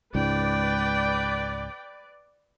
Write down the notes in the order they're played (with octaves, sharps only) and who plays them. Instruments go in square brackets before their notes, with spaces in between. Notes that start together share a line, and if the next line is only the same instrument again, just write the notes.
[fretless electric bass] C#2 G#2 [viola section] B4 D5 [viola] G5